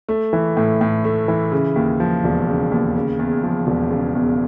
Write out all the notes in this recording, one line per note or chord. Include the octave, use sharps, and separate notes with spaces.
A3
E3
A2
A2
A3
E3
C#3
D#2
F3
E1
C#3
D#2
C#3
E2
F3
E1
C#3
E2